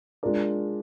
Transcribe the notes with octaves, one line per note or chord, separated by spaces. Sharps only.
G#3 D4 F4 A#4 D5